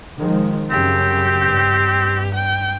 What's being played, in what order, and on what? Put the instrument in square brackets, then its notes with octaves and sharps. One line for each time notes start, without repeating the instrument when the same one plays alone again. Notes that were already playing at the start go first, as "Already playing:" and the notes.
[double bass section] D#3 F3 G#3
[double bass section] F#2 C#3 [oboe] C4 [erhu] G4
[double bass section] G2
[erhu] G5